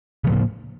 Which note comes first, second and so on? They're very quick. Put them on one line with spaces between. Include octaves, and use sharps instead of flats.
C#3 F3 A2 A#3